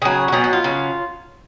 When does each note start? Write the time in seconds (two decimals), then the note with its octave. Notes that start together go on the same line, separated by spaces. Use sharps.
0.02 C#3 F#3 G#4
0.28 F#4
0.32 B2 F#3 G#4
0.44 F#4
0.53 F4
0.64 C#3 F#3